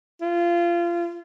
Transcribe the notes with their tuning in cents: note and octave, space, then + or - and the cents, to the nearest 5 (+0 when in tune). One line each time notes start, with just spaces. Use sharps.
F4 -25